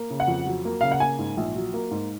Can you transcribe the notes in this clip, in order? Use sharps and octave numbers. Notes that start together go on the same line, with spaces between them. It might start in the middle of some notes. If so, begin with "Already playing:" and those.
Already playing: A#3
C#3
F#5
F2
F#3
A#3
C#3 F5
F#5
A#3 G#5
G#2
A#1
F#3
A#3
G#2